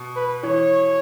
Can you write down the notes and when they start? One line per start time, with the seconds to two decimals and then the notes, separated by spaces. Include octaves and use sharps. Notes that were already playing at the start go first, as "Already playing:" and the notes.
Already playing: B2
0.16 B4
0.43 E3 C#5